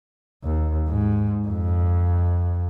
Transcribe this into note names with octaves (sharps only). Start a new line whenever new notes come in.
D#2
G#2
F2